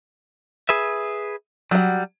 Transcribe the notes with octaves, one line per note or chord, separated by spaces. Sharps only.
G#4 B4 E5
F#3 G3 F#5